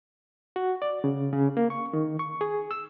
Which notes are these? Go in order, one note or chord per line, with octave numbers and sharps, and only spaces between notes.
F#4
D5
C#3
C#3
A#3
C#6
D#3
C#6
G#4
E6